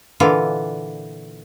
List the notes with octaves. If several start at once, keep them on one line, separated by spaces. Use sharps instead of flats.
A#2 D3 E3 F4